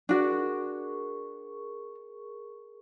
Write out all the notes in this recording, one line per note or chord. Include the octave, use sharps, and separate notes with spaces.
D4 F#4 G#4 A#4 D5 C#6